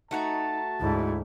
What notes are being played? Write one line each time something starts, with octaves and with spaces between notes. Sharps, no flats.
A3 D#4 F#4 A5 A#5
D2 G#2 E4